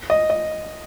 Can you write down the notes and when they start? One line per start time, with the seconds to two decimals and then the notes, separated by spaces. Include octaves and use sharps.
0.10 D#5
0.30 D#5